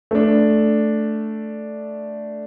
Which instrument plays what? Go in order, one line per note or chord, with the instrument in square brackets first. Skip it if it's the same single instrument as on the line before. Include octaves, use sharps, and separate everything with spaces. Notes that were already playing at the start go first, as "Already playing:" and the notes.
[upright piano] A3 D4